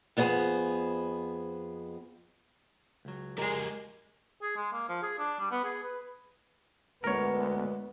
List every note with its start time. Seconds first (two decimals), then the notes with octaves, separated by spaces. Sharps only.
0.17 F2 B3 D4 E4 G#4 C5
3.05 C#2 F#3
3.38 F2 G#3 G4 A#4 D#5
4.42 G#4
4.57 G#3
4.73 A#3
4.89 F3
5.02 G#4
5.19 D4
5.40 G3
5.51 B3
5.65 G#4
5.83 B4
7.04 D2 G#3 B3 A#4 C#5